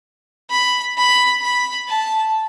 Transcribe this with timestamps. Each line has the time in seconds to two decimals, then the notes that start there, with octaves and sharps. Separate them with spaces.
0.50 B5
0.97 B5
1.42 B5
1.88 A5